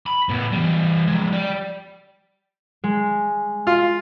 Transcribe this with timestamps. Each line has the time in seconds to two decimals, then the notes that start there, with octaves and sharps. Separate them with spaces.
0.06 B5
0.29 A2 B3
0.52 E3 G3
1.08 F3 G#3
1.33 G4 D5
2.84 G#3
3.67 F4